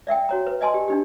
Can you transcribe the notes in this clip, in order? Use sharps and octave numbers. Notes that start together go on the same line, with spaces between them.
D5 E5 F#5 G5
F#4 C#5 A#5
B4
D5 D#5 G#5 A5 C6
G4
D4 D#4 G4